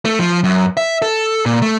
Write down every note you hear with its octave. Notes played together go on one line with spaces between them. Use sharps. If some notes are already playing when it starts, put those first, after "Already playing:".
A3
F3
F#2
E5
A4
A#2
A3